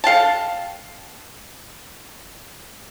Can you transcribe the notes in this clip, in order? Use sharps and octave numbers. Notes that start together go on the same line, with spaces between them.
A4 F5 G5 A5